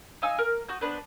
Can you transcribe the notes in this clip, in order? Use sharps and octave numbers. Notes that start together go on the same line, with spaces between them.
D#4 F5 G#5 E6
A#4
F#4 D#6 G6
B3 D4 B4 C5